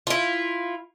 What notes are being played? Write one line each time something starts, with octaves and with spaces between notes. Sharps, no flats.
E4 F4